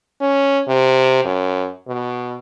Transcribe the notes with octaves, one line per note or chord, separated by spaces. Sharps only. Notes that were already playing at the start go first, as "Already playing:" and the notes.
C#4
C3
F#2
B2